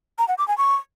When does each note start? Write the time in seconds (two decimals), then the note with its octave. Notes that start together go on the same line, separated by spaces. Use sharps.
0.18 A#5
0.28 F#5
0.38 D6
0.48 G#5
0.58 C#6